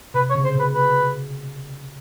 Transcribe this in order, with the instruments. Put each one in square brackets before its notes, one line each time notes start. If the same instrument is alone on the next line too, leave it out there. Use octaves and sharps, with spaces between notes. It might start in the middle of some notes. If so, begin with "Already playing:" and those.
[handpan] C3 [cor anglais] B4
[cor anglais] C#5
[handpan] C#3
[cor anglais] C5
[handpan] B2
[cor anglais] B4
B4